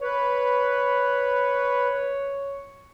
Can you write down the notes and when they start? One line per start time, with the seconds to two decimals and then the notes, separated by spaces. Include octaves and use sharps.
0.01 B4 C#5